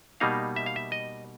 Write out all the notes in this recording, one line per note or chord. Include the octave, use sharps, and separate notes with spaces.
B2 G3 A#3 D#4 F5
E5
F5
E5
D#5